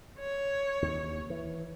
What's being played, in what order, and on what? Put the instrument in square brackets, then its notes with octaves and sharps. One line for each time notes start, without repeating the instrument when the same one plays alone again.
[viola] C#5
[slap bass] D#2
E3